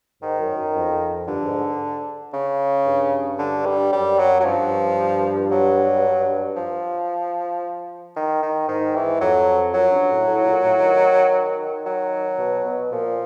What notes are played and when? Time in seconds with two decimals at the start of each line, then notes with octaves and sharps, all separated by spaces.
0.22 G#2 D#3
0.39 F#2
0.57 F#2
0.75 F2
1.27 G2 D3
1.45 G#2
2.33 C#3
2.86 G2
3.39 D3
3.65 G3
3.93 F#2 G3
4.19 F#3
4.40 F#3
4.45 G2 F3
5.51 F#3
6.56 F3
8.16 D#3
8.42 D#3
8.68 G#2 D#3
8.96 E3
9.21 F2 F#3
9.74 F#2 F#3
9.92 G2
10.09 A2
10.27 A2
10.45 A#2
10.63 A2
10.80 D#3
11.86 F#3
12.39 B2
12.65 B2
12.92 A#2 F3